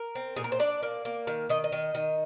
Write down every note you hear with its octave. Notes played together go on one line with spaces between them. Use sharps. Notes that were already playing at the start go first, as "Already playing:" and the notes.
Already playing: A#4
C4
A#2 G#4
A#4
C5
D4 D5
A#3
A#3
D#3
D#3 D#5
D#5
D#3
D#3